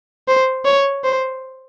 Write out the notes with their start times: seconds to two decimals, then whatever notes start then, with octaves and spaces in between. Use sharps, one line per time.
0.28 C5
0.65 C#5
1.04 C5